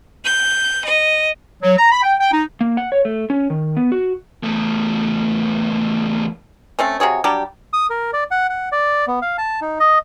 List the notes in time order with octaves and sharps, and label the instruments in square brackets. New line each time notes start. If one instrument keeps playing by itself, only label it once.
[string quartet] G6
D#5
[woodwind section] F#3
A#5
B5
G5
G5
D#4
[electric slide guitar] A#3
F#5
C#5
A3
C#4
D#3
B3
F#4
[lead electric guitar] E2 A3
[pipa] A3 C4 C#4
C3 F#4 G#4 C#5
F#3 G3 D4 G4
[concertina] D#6
A#4
D5
F#5
F#5
D5
B3
F5
A5
D#4
D#5